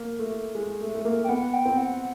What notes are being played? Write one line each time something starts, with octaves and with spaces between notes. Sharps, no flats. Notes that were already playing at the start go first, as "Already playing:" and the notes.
Already playing: A#3
A3
G#3
A3
A3
A#3
G5
B3 F#5
G5
C4
F#5